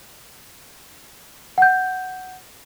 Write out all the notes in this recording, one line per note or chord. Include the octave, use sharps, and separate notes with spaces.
F#5 G6